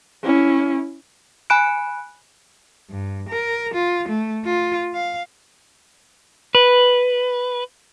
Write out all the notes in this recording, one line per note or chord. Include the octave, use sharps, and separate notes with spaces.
C#4 E4
G#5 B5 F#6 D7
G2
A#4
F4
A3
F4
F5
B4